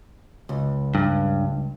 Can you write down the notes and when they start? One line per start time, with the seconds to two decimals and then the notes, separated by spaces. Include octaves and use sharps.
0.49 C#2
0.95 G2